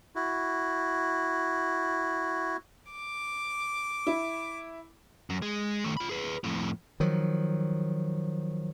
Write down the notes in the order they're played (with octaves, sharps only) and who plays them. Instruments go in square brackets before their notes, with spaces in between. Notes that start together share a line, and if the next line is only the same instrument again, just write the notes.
[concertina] E4 F#4
[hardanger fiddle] D6
[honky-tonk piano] E4
[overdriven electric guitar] F#2
G#3
D#3 A3
F4 B5
G#4 B4
F2 A2
[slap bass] D#3 F3 F#3